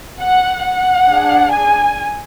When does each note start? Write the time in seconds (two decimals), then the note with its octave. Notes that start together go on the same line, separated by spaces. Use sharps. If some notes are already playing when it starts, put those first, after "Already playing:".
0.21 F#5
0.65 F#5
1.09 D4 G#4
1.53 G#5